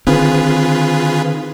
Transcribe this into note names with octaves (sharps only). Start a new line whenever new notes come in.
D3 D#3 C4 F4 G#4 B4